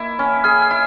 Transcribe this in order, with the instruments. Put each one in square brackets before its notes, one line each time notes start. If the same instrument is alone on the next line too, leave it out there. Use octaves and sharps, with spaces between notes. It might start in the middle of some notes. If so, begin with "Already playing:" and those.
Already playing: [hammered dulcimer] A#3 E4
C#4
[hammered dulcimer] G#4 [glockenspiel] F6
[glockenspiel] F6
[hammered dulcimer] E4